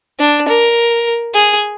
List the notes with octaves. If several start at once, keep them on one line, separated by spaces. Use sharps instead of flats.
D4
A#4
G#4